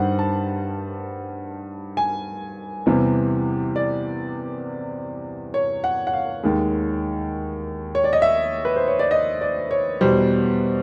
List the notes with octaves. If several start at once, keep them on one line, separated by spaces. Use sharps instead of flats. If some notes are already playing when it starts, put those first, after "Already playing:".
Already playing: G2 D#3 G3 C5 F#5
A5
G#5
E2 C3 E3 G3
D5
C#5
F#5
F#5
F5
D#2 D#3 G#3
C#5
D5
D#5
E5
B4
C5
C#5
D5
D#5
D5
C#5
E2 B2 G3 C5